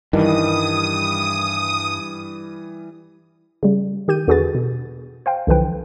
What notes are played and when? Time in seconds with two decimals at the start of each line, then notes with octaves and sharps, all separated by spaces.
0.13 G2 D#3 E3 G3 D#6
3.63 C#3 G3
4.08 D#3 G4 G6 D#7
4.27 E2 D3 F#4 G#4 B4 A6
4.55 B2
5.26 C5 F5 G5
5.47 C2 D3 E3 F3 B4 G5